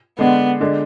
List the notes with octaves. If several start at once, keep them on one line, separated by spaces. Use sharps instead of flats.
D3 G#3 B3 D4
D3 G#3 D4